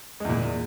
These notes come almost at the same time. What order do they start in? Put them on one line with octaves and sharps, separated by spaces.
G#3 E2 A#2